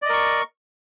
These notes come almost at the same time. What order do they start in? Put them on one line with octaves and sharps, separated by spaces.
D5 D#5 A#4 C#6